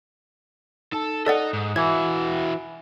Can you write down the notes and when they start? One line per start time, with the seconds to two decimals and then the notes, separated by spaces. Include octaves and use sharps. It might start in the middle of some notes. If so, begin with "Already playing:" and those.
0.93 D#4 A4 A5
1.26 D#4 A4 D5 D#5 F#5 D#6 F#6
1.53 G#2
1.76 E3 E4 F#4 E5 G#5 B5 G#6